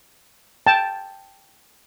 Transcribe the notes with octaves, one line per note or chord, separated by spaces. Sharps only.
G5 A5